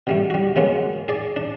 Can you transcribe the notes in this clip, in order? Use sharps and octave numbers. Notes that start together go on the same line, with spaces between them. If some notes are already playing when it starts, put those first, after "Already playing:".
B2 G3 A3
G3 F#4
B2 F#3 G#3 A#3 B3
G#4 D5
D4